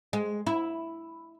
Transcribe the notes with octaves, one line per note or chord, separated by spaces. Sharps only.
G#3
E4